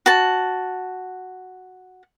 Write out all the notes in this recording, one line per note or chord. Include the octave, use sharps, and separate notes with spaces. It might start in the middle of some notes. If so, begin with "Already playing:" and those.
F#4 A5